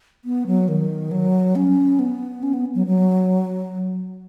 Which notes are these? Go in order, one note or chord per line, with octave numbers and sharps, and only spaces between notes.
B3
F#3
D#3
F#3
C#4
B3
C#4
B3
F#3
F#3